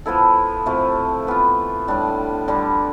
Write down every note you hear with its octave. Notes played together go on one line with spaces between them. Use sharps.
F3 B3 E4 A4
C3 F3 A3 E4
E3 B3 F4
A2 G3 D4 G4
D3 G3 D4